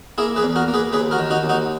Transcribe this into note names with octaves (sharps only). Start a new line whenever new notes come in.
A#3 E4 G#4
G#4 B4
E2
F#4 A#4
A#3
G#4 B4
D#2 G#4 B4
F#4 A#4
D#3
D#4 F#4
D#2
D#4 F#4